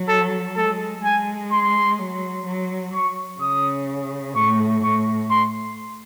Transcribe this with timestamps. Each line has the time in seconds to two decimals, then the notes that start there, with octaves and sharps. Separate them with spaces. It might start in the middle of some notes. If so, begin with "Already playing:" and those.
Already playing: F#3
0.08 A4
0.56 G#3 A4
1.04 G#3 G#5
1.52 C6
1.99 F#3
2.46 F#3
2.94 C#6
3.41 C#3 D#6
4.36 A2 C#6
4.83 A2 C#6
5.30 C6